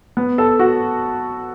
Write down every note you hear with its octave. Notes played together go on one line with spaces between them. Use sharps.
B3
A4
F#4